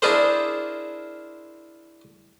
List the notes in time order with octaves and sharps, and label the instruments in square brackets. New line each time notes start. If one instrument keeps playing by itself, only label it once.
[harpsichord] D4 E4 F4 G#4 A#4 C5